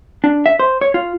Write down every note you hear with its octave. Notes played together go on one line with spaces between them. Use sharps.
D4
E5
C5
C#5
F4